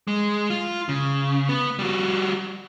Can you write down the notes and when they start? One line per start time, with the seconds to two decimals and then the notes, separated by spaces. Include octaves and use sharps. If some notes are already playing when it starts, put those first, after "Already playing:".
0.08 G#3
0.50 F4
0.89 C#3
1.49 B3
1.79 G3 F#4